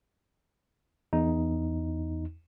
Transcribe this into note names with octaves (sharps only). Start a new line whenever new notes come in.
E2 D#4